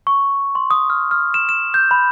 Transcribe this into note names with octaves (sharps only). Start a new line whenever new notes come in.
C#6
C6
D#6
F6
F6
E7
E7
G6
B5